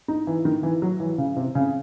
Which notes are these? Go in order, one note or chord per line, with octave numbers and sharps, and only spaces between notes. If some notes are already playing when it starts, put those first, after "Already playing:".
D#4
E3
D#3
E3
F#3
E3
C#3
C3
C#3